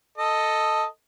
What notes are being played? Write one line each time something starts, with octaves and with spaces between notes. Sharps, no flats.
A4 D#5